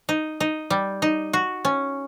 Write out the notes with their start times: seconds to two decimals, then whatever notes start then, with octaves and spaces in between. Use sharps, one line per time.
0.09 D#4
0.40 D#4
0.70 G3
1.02 D#4
1.33 F#4
1.65 C#4